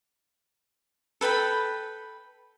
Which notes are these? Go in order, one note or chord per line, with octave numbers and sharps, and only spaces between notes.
A4 B4 G5 B5